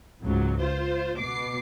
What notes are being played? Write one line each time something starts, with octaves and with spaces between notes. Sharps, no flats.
C#2 G#2 F#3
F4 C5
B2 D6 C7